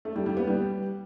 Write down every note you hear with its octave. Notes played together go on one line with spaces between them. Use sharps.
A3
G3
G3
B3
G3